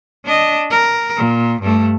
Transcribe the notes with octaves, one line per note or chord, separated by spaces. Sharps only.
D4 D#5
A#4
A#2
G2 A3